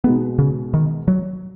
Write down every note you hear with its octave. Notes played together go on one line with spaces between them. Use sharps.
B2 G#3 B3 D#4
C#3
D#3
F#3